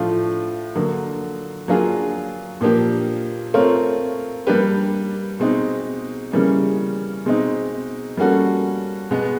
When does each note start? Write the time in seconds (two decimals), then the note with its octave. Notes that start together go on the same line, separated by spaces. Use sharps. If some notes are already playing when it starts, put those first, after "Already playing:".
Already playing: A2 F3 A3 D4 F4
0.75 D3 F#3 A#3
1.68 F#3 A#3 D4 F4 G#4
2.61 A#2 F3 A#3 D4 G4
3.54 A3 C4 F4 A#4 C#5
4.47 G3 A#3 D4 G4 B4
5.39 B2 G#3 C4 D#4
6.32 C#3 E3 G3 A#3 C#4
7.25 B2 G#3 C4 D#4
8.17 G3 A#3 C#4 F#4 A4
9.11 B2 G#3 B3